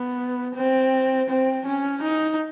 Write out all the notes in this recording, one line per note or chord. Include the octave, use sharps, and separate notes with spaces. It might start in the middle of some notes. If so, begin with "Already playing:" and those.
Already playing: B3
C4
C4
C#4
D#4